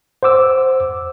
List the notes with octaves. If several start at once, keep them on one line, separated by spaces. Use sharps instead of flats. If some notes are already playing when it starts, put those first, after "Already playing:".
C5 F#5 D6 E6